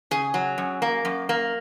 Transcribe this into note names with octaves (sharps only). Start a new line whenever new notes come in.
C#3 G#4
F#3
F#2
A#3
F#2
A#3